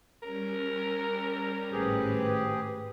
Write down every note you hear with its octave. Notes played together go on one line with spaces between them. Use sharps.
G3 C#4 A#4
G#1 A2 C4 G4 G#4 B4